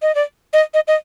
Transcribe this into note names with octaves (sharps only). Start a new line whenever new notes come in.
D#5
D5
D#5
D#5
D#5